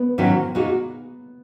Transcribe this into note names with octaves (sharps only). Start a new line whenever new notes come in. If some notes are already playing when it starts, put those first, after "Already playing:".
Already playing: B3
G#2 D#3 F#3 C#4 E4
A#2 G#3 D#4 F#4